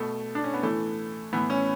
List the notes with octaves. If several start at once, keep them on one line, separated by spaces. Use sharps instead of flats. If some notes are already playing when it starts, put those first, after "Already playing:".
Already playing: B2 A3
D4
C#4
B3
A2 E3 A3
A2 E3 B3
C#4